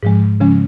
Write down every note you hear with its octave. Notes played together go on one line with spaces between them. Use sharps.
G#2 F3 G#3
C#3 F3 G#3 C#4